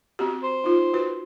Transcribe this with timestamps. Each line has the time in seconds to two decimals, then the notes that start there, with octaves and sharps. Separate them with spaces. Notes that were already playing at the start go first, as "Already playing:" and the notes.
0.19 C4 F#4 G4
0.43 C5
0.64 D#4 F4
0.94 F#4 B4